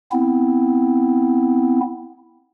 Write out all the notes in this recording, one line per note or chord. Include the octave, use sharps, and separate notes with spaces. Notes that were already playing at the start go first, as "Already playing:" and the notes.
B3 C4 E4